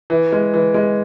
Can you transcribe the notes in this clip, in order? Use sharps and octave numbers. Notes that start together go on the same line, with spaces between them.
E3
G#3
E3
G#3